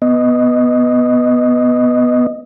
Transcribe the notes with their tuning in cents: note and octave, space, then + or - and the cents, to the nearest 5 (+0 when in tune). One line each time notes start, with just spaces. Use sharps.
B3 +0 D#5 +0